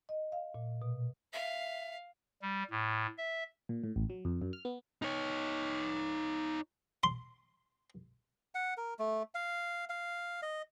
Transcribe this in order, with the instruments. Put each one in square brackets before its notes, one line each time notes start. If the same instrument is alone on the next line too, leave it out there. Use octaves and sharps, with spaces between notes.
[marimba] D#5
F5
A#2
B2
[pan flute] E5 [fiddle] F5
[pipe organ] G3
A2
E5
[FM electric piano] A#2
A2
A1
F#3
F2
F#2
F6
B3
[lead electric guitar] D#4 C#5
[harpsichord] C6
[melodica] F#5
A#4
A3
F5
F5
D#5